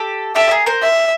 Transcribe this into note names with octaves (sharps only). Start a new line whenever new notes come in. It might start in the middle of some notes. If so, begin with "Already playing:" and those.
Already playing: G4 A4
G4 A4 E5
G#4 A#4
A#4 C5
E5